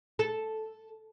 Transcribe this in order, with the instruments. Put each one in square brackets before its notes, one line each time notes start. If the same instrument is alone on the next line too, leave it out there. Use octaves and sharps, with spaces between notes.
[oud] A4